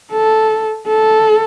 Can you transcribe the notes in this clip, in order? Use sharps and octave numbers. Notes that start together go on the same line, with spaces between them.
A4
A4